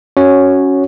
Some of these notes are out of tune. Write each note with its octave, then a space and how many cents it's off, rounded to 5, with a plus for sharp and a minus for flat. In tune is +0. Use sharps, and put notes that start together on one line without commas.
C#4 +0 F#4 +0 C#5 -5